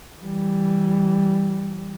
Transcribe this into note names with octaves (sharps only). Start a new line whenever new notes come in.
E3 G3